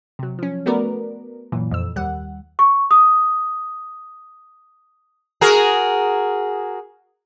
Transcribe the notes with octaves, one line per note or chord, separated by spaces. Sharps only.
C3 F#3
F3 C#4
A3 B3 F#4 A#4 B4 D5
F#2 A#2 E3
F2 E6
D#2 G3 F#5
C#6
D#6
F#4 G#4 A#4